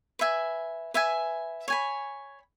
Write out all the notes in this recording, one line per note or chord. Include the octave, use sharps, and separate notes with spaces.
B4 E5 G#5
B4 E5 G#5
C#5 G#5 B5